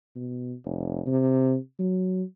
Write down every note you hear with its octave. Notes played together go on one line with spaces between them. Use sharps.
B2
F1
C3
F#3